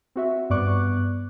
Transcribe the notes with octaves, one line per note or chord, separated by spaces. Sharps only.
C4 F#4 E5
G2 B3 D5 C#6 D6 F#6